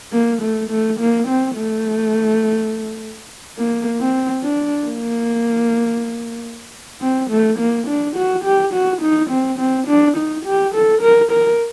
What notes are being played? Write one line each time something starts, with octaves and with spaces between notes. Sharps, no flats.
A#3
A3
A3
A#3
C4
A3
A#3
C4
D4
A#3
C4
A3
A#3
D4
F#4
G4
F#4
D#4
C4
C4
D4
D#4
G4
A4
A#4
A#4